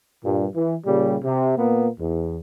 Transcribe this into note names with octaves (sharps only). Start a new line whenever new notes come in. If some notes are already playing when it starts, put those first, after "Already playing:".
G2 A#2
E3
A#2 C#3 G3
C3
A#2 A#3 B3
E2